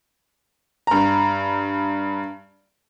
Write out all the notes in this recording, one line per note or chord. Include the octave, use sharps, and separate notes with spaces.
G2 A#5